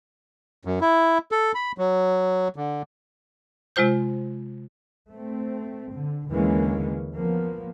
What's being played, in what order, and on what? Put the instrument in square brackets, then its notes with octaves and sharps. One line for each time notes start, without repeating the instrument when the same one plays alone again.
[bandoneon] F#2
E4
A4
B5
F#3
D3
[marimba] C3 G#3 F4 C5 G6
[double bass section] A3 C4
D3
D#2 D3 E3 G#3 A#3 C#4
F3 A#3 B3